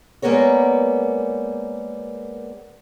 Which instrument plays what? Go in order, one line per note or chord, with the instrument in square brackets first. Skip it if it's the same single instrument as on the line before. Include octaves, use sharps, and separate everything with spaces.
[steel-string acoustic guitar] G3 G#3 A#3 B3 A#4 C#5